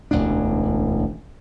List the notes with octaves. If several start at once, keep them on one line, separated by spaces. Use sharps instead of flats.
E1 A1 D2 D4